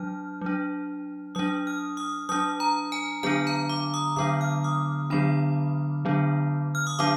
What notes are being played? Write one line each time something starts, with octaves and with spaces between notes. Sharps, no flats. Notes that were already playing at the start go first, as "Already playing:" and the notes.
Already playing: F#3 D4 F6
F#3 D4
F#3 D4 D#6
F6
D#6
F#3 D4 D#6
A#5
G#5
D3 F#3 B3 D4 G#5
A#5
D6
D#6
D3 F#3 B3 D4 D#6
F6
D#6
D3 F#3 B3 D4 B5
D3 F#3 B3 D4
F6
D#6
D3 F#3 B3 D4 D6